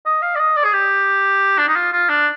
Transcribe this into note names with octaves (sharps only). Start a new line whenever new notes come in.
D#5
F5
D5
D#5
D5
G#4
G4
D4
D#4
F4
F4
D4